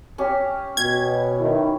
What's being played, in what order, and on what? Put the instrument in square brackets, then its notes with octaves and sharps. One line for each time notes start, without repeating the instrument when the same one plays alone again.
[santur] C#4 G4
[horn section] B2 [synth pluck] G#6
[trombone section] D#3 E4